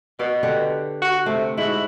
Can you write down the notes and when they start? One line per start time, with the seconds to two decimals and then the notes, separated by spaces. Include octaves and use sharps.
0.19 B2 D5
0.43 D3 G4 F#5
1.02 F#4
1.26 C3 A3
1.58 G#2 E4 F#4